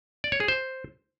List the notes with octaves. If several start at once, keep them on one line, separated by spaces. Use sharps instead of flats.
D5
C#5
G#4
C5